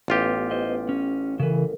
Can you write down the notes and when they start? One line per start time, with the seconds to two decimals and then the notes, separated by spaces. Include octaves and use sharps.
0.08 A1 B3 F4 G4 B4
0.51 C5 D#5
0.89 C#4
1.40 C#3 E3 A4 A#4